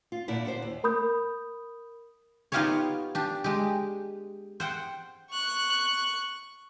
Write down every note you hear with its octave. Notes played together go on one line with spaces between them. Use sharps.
F4
A#2 D3 E4
D4 F#4 G#4 C5
D#2
A#4 B5 D#6 G6
B3 D#4 F4 G4 C5 C#5
D4 G4
G#3 G4
C5 F#5 G5
C#6 F#6